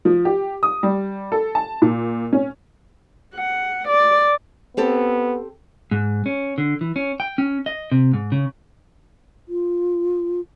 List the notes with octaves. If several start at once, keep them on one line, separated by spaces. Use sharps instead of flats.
F3
G4
D#6
G3
A4
A5
A#2
C#4
F#5
D5
B3 C4 G4 A4
G#2
C#4
D3
E3
C#4
G5
C#4
D#5
C3
G#2
C#3
F4